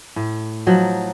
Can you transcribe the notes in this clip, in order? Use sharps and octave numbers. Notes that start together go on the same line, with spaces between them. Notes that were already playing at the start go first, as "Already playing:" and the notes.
A2
F3 F#3 D#4